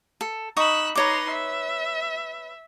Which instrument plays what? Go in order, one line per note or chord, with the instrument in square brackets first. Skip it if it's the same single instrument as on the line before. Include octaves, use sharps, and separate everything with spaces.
[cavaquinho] A4
[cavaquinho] D#4 C#6 D#6 [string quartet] B5 E6 F#6
[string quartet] D#4 A#5 C6 [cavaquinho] B4 C#5 D6
[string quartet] E5